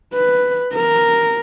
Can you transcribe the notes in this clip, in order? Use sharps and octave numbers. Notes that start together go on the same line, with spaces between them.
B4
A#4